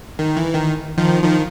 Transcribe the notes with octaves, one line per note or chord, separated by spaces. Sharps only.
D#3
E3
D#3
D#3 F3
D#3 F3